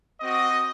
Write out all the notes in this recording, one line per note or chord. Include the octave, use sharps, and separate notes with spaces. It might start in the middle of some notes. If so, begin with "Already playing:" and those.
C4 F#4 D#5